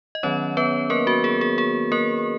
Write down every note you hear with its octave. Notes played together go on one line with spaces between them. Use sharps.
D#5
D#3 F#3 B3 C#4 C#5
B3 B4
A#3 A#4
F#4
G#4
G#4
G#4
A#3 A#4